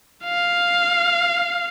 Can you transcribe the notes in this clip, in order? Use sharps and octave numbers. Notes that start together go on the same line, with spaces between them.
F5